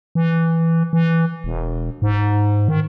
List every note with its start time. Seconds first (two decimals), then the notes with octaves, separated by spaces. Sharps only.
0.15 E3
0.93 E3
1.44 E1
2.02 G#2
2.68 D#3